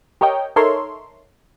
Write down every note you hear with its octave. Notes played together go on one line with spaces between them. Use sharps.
G4 A#4 C#5 D#5 G5
D#4 A4 A#4 C#5 E5 C6